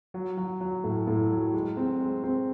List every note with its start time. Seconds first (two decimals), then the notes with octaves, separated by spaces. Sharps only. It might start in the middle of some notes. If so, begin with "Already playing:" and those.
0.14 F#3
0.37 F#3
0.61 F#3
0.84 A2
1.07 A2
1.30 F#3
1.54 G#3
1.77 C4
2.01 G#3
2.24 C4